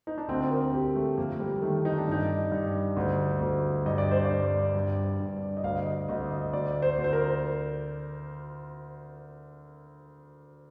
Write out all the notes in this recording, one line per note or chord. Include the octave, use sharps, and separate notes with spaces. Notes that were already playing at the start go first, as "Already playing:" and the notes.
D#4
D4
D2 C4
A#4
D2 G4
A3
F2 A#3
G3
D#3 A3
D#4
D4
G2 D#4
G2
D2
D2
G2 D#5
D5
C5
D5
G2
G2
G2
D#5
D2 F5
D#5
D2 D#5
D#5
D2 D5
C5
D2
C5
A#4